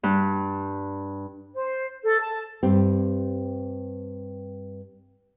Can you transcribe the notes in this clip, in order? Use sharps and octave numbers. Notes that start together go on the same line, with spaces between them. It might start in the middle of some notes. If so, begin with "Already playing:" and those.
G2
C5
A4
A5
G2 C4 G4